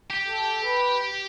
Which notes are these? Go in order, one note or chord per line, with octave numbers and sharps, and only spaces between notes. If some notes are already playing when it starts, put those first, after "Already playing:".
G4
A4
B4